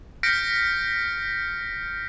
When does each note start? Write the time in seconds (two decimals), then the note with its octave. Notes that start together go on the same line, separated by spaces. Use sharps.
0.23 F6 G6 A#6 B6 C#7 D7